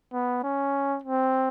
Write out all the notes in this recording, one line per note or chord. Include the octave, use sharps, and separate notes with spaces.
B3
C#4
C4